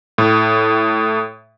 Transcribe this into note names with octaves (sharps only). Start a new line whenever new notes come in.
A2